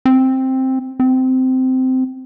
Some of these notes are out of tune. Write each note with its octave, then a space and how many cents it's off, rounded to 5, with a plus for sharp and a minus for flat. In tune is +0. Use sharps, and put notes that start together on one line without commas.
C4 +5
C4 -15